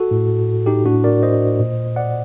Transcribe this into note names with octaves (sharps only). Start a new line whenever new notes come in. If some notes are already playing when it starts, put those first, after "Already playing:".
Already playing: F#4 A4
A2
D#4 G4
A2 D4 F#4
A#4 D5
C5 D#5
A#2
D5 F#5